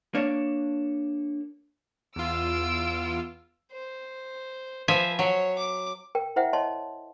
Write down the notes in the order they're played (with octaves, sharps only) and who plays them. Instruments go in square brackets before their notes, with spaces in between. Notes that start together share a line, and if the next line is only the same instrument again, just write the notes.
[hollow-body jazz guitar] A#3 D4 C#5
[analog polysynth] E2 F4 [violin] E6 D7
[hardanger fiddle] C5
[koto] F3 E5 G#5 [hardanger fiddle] B4 C5
[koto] F#3 [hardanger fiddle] C#5
[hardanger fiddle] D6
[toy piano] A#4 G5
E4 C5 E5 F#5 G5
C#5 D#5 A5 C6